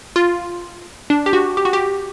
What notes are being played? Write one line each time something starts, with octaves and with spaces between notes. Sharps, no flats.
F4
D4
G4
F#4
G4
F#4
G4